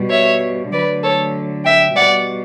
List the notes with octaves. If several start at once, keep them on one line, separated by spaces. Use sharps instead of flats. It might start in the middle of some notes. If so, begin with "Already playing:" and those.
Already playing: B2 G3
C#5 E5
D3 F#3 A3 B4 D5
A4 C#5
E5 G5
B2 G3 D5 F#5